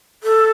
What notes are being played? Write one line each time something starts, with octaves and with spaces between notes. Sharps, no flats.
A4